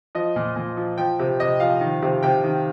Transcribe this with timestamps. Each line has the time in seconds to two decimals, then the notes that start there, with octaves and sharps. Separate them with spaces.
0.15 F3 D#5
0.36 A#2
0.56 A#2
0.77 F3
0.98 F3 G5
1.19 C3
1.40 C3 D#5
1.60 F3 F5
1.81 D#3
2.02 C3
2.23 C3 G5
2.44 D#3